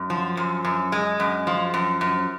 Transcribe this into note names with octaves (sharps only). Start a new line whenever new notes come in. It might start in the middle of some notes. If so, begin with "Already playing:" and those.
Already playing: F#2
F3
F#2
F#2
G#3
F#2
F3
F#2
F#2